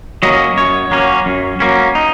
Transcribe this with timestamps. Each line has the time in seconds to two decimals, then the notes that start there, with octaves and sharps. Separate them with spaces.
0.23 F#3 A#3 C#4 D#5
0.57 F#2 C#5
0.91 F#3 A#3 C#4
1.26 F#2
1.60 F#3 A#3 C#4
1.95 D#4